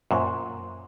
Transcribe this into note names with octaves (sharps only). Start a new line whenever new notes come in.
F#2 A#2 C5 C6 C#6